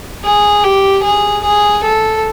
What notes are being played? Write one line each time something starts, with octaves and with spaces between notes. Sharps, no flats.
G#4
G4
G#4
G#4
A4